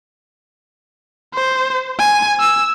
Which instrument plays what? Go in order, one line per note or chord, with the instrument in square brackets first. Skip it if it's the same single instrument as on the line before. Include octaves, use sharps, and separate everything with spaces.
[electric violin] C5
G#5
E6